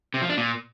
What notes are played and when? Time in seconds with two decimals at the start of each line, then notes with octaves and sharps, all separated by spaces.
0.14 C3
0.22 F3
0.30 D4
0.37 A#2